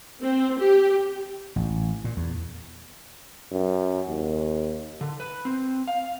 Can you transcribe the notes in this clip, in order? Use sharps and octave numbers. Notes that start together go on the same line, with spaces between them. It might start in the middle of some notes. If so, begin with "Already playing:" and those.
C4
G4
A1
A#2
E2
F#2
D#2
D3
B4
C4
F5